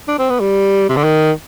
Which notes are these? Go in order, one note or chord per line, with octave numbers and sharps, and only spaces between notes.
D4
C4
B3
G3
C3
D3
D#3